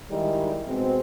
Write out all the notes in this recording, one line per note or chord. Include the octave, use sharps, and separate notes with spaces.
D#3 G3 G#3 D#4 E4
B2 G#3 C4